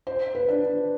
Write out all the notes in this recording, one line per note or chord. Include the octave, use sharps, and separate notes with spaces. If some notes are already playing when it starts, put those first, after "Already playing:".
C5
B4
D4